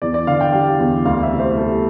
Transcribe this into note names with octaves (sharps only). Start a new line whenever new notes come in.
E2 D5
D5
D3 F5
G5
G3 F5
E2
D2 F5
E5
C3
C5
G3 A4